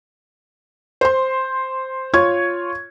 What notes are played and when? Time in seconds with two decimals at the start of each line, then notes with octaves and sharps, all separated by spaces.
1.01 C5 C6
2.14 F4 C#5 C#6 G#6